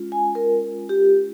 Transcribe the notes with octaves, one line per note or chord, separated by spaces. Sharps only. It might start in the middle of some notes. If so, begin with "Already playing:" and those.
Already playing: G#3 C#4 F4
G#5
A#4
G4